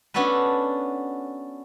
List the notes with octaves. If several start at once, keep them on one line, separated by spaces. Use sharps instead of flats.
B3 C#4 D4 F#4 A4 B4